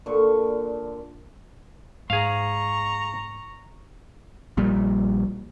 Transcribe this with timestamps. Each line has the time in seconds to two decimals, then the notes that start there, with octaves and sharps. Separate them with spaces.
0.06 A#2 D3 C#6
2.10 G#2 G#4 F5 A#5 C#6
4.57 A#1 A#2 G3